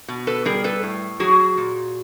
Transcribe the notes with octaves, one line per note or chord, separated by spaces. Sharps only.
B2
A4 B4
G3 G#4 A#4
A4 B4
A2
F#3 F#4 G#4
A#2